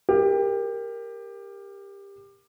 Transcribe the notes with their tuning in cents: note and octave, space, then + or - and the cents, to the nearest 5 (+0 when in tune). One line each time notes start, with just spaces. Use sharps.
G4 +20 A#4 +0